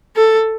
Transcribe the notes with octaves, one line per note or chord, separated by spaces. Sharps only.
A4